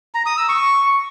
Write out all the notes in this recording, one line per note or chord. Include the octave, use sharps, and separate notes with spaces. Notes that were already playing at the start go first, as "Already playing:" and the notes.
A#5
D#6
E6
C#6